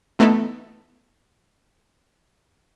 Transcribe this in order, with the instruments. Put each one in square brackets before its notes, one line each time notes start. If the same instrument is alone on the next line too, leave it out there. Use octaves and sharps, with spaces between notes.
[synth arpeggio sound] E3 A3 B3 D#4 E4 A4